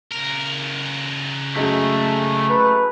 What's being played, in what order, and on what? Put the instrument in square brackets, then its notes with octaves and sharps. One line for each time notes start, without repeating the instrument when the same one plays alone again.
[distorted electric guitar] C#2 A#4
[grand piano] F#2 G#3 [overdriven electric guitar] A3
[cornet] B4